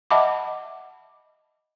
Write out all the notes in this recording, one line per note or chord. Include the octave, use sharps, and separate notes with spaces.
D#5 E5 F#5 A5 B5 D6